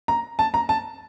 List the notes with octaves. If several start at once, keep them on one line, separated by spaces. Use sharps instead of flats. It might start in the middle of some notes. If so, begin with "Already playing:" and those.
A#5
A5
A#5
A5